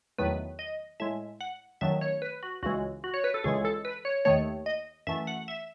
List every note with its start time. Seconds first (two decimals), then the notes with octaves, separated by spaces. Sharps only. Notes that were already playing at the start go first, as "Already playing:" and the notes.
0.18 E2 D#3 F#3 A3 B4
0.59 D#5
1.00 A2 G#3 E5
1.41 F#5
1.81 F#2 D#3 F#3 A3 E5
2.01 C#5
2.22 B4
2.43 F#4
2.63 C#2 C#3 E3 G#3 F#4
3.04 F#4
3.14 C#5
3.24 B4
3.34 A4
3.44 C#2 C#3 E3 G#3 G#4
3.65 A4
3.85 B4
4.05 C#5
4.25 D#2 D#3 A3 C#5
4.66 D#5
5.07 F#2 E3 A3 E5
5.27 F#5
5.48 E5